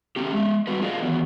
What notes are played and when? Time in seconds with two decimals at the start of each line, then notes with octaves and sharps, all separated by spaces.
0.16 A3 C4 C#4 G4
0.32 G#3 E5
0.67 G3 C4 F#4 B4
0.82 F4 G#4 A#4 D5 D#5 F5
1.02 D#3 E3 F#3 B3